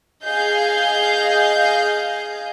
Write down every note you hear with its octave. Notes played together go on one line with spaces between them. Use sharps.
G#4 D#5 F5 G6